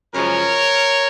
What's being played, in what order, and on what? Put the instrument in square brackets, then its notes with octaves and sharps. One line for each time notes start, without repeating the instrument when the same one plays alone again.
[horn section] F#2 C#3 F3 G#3 A#4 C#5